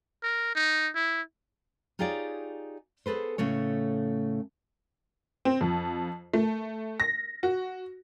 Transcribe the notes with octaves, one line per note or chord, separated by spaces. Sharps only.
A#4
D#4
E4
D#4 F4 G4 G#4 C#5 D5
B3 G#4 A4 B4 C5
A2 C#3 A3 C#5
C4
F2
A3
A#6
F#4